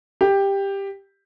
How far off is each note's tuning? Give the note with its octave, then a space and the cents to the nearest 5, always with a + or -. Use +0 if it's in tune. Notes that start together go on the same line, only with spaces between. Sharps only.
G4 +10